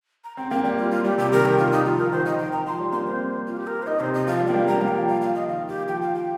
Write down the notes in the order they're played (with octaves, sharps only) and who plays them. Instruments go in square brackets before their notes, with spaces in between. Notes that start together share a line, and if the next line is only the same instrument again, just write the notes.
[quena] A#5
[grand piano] C4 [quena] G5
[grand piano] A#3 [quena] G5
[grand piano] G3 [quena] G4
[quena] F4
F4
[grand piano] G3 [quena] G4
[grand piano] C3 [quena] G4
[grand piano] D#3 [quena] A#4
[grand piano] D#3 [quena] G4
[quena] F4
D#4
[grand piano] F3 [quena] F4
[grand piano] F3 [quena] A#4
[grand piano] D#3 [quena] C5
[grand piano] D#3 [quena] D#5
[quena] G5
A#5
[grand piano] F3 [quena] C6
[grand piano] G3
[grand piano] A#3 [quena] C6
[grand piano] C4 [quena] C5
[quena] F4
G4
A#4
C5
[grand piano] D#4 [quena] D#5
[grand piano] C3 [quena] C5
[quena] D#5
[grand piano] F3 [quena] F5
[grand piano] G3
[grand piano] A#3 [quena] G5
[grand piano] G3
[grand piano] A#3 [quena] A#5
[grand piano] G3 [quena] F5
[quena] G5
[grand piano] F3
[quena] F5
F5
D#5
[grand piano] D#3 [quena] F5
[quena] G4
[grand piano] F3 [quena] G5
[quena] F5
G5